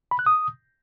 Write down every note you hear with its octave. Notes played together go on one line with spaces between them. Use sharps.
B5
F#6
D#6